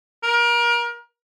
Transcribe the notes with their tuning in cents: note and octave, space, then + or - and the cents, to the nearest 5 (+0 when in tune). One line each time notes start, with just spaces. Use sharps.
A#4 +30